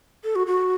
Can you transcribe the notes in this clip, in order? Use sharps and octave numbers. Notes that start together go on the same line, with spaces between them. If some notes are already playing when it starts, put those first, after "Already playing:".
A4
F#4
F#4